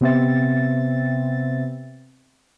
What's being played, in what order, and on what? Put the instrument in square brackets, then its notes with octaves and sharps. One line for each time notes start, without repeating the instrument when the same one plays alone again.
[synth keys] C3 B3 C4 E5 A6